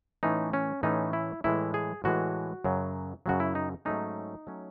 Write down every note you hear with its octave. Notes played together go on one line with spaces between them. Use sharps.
A2 E3 A3 C#4 D#4
C#4
A2 E3 A3 C#4 D#4
E4
A2 E3 G#3 E4
G#4
A2 E3 G#3 F#4
F#2 C#3 F#3
F#2 C#3 F#3 F#4
E4
D#4
G#2 F#3 A3 C#4 D#4
F#3 A3 C#4